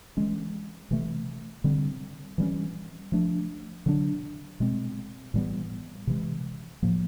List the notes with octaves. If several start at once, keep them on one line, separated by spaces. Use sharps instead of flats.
E3 G#3 C#4
C3 E3 A3
D3 G3 C4
E3 G3 A#3 C#4
F3 A3 D4
D3 F#3 A#3 D4
B2 G#3 C4
A2 E3 G3 B3
C3 E3 G#3
A2 F3 A#3